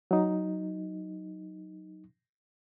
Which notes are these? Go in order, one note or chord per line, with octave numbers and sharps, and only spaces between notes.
F#3 D#4